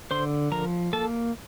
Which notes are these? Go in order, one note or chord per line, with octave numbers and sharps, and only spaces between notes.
D3 C5 C6
F3 A#4 A#5
A#3 A4 A5